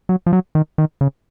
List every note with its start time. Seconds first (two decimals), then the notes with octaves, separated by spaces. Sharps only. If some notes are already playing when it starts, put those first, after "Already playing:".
0.09 F#3
0.26 F3
0.33 F#3
0.55 D#3
0.78 D#3
1.01 C#3